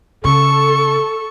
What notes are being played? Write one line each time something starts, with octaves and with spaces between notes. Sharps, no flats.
C#3 A4 C#6